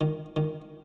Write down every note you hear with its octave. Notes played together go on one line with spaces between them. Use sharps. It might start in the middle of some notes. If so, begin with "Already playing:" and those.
D#3
D#3